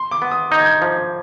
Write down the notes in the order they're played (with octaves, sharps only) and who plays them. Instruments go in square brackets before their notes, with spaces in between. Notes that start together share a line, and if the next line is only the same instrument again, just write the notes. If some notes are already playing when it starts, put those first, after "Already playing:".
Already playing: [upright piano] C6
D6
[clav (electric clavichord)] B3
[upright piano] D#6
[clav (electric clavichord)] D#4 [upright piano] G6
[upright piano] G#6
G6
[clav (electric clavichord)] F3